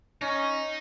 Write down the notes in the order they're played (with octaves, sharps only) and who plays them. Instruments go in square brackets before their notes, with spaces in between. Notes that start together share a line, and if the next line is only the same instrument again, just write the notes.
[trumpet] C#4 [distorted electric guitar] D#4